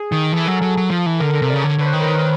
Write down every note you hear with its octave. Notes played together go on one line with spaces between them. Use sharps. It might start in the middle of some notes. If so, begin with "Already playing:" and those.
Already playing: G#4
D#3
E3 A4
F#3 A#4
A4
F#3
F#3
F3
E3
D3 A#4
A#4
C3
C#3 D5
D3 C#5
D3 B4
C5
D#3
A#4
B4